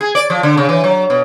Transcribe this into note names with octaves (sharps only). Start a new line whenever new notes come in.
G#4
D5
F3
D3
C#3
E3
F#3
B2